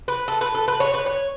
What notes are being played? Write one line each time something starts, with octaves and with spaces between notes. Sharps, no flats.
B4
A4
B4
A4
B4
C#5
B4
C#5